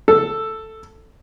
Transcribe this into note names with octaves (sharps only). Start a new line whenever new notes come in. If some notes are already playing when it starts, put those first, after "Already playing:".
A4